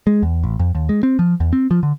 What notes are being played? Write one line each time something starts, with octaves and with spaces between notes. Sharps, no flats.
G#3
E2
A1
F2
D#2
G#3
C4
F3
E2
C4
F3
D3